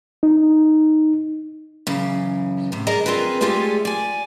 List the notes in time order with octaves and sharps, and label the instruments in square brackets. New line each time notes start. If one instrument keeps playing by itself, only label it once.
[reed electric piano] D#4
[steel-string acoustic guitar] F#2 C#3 E3
A2 C3
G#4 A#4 D5 D#5 A#5
C4 F4 G#4 A#4 B4
G#3 A3 F4 G4 G#4 D5
D5 G#5